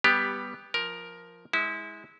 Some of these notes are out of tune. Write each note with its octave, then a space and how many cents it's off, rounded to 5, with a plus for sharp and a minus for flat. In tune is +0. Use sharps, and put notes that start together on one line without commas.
G3 +0 B3 +0 G4 +15
F3 +0 A#4 +10
G#3 +0 E4 -25